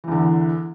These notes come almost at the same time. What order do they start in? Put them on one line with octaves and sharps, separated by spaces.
E3 E2 D3